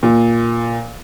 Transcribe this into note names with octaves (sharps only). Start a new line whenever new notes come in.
A#2